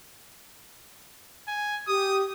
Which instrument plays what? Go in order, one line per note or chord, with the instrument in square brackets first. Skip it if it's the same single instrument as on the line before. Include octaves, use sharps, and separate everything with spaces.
[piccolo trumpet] G#5
[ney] G4 [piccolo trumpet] D#6